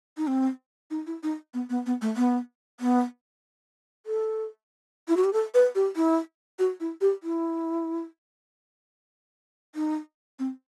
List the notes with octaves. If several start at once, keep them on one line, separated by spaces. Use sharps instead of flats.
D#4
C4
D#4
E4
D#4
B3
B3
B3
A3
B3
B3
A4
E4
F#4
G4
A4
B4
G4
E4
F#4
E4
G4
E4
D#4
C4